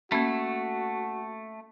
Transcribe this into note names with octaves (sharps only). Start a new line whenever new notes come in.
A3 A#3 C#4 F#4